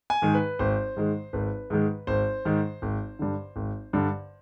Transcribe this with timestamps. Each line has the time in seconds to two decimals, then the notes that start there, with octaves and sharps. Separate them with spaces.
0.10 G#5
0.22 G#2 D#3 G#3
0.34 B4
0.59 G#1 C5
0.97 G#2 D#3 G#3
1.33 G#1 B4
1.70 G#2 D#3 G#3
2.07 G#1 C5
2.45 G#2 D#3 G#3
2.82 G#1
3.19 G2 D3
3.56 G#1
3.93 G2 D3